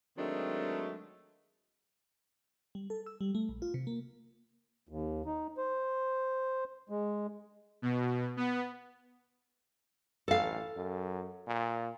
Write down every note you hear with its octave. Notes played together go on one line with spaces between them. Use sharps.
D#3 F#3 G#3 A3 C4 D4
G3
A4
E6
G3
A3
A#1
F4
C3
A#3
D#2
D#4
C5
G#3
B2
B3
A1 A4 F5
F#2
A#2